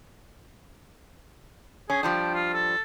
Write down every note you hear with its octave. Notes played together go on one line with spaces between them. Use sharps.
C#4 G#4
F3 G3 D4 G5
F4
A4